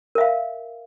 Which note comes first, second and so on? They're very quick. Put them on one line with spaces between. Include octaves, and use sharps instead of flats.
A#4 E5 F5